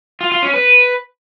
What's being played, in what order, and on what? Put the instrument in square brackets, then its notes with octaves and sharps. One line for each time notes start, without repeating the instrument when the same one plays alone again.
[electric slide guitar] F4
F4
C#4
B4